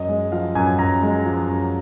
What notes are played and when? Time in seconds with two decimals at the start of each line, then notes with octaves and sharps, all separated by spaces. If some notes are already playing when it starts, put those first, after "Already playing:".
Already playing: F#2 D#5
0.09 G#3
0.32 F3 F5
0.55 F#2 G#5
0.79 F#2 A#5
1.02 G#3
1.26 F3
1.49 F#2